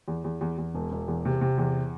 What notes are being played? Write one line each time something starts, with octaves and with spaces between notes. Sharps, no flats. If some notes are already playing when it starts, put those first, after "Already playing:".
E2
E2
E2
E2
E1
E1
E2
C3
C3
E2